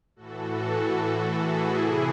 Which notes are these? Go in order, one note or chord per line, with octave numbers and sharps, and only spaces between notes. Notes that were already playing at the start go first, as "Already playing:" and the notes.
A2 E3 F#4 A4
E4 G#4
C3 E3